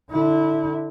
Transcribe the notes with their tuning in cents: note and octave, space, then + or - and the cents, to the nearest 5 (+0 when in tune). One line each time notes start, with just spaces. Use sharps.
D3 +10 E4 -20